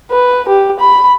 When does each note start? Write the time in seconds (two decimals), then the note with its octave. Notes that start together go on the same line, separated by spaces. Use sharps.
0.11 B4
0.49 G4
0.80 B5